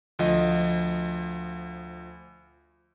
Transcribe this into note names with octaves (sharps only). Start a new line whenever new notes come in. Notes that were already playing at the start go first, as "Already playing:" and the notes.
D2 F3 D#5